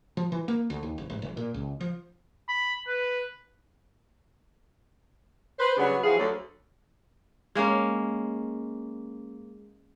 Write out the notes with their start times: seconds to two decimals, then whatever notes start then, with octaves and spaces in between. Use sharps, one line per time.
0.17 F3
0.32 E3
0.48 A#3
0.70 D2
0.83 D#2
0.98 F#1
1.10 G#1
1.22 F1
1.37 A#2
1.54 C#2
1.81 F3
2.49 B5
2.88 B4
5.59 B4 C5
5.77 C#3 F#3 G3 B3 D4 F#4
6.04 E2 F3 F#4 G#4 F5
6.17 D2 F#3 A4
7.55 G#3 A#3 C#4